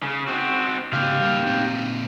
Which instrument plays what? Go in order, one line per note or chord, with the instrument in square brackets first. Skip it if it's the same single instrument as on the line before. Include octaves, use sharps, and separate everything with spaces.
[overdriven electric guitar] C#3
C4 F#4
[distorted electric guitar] G#2 C#3 [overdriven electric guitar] G4 F5
[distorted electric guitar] G3 A#3
A#2 C4